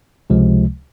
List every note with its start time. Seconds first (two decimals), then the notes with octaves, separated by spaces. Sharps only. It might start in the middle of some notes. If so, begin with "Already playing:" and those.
0.30 C#2 C3 F3 G#3